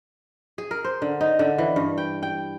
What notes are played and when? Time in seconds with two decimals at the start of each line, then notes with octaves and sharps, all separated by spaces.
0.58 G#4
0.71 A#4
0.84 C5
1.02 D3
1.21 D#4
1.39 D3
1.58 E3
1.76 G2
1.98 G5
2.23 G5